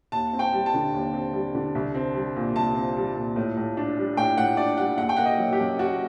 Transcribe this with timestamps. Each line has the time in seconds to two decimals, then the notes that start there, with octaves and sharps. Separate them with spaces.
0.12 D#2 A5
0.33 C4
0.39 G5
0.53 G3
0.66 A5
0.74 D3
0.93 D#2
1.13 C4
1.33 G3
1.54 D3
1.75 C2
1.94 C4
2.15 G3
2.36 A#2
2.56 C2 A5
2.75 C4
2.96 G3
3.15 A#2
3.36 A2
3.57 A2
3.77 D4
3.97 G3
4.17 A2 G5
4.37 A2 F#5
4.57 D4 D5
4.77 G3 F#5
4.98 F#1 F#5
5.09 G5
5.17 A#3 F#5
5.25 D#5
5.38 F#3
5.53 G4
5.59 F#2
5.79 F#1 F#4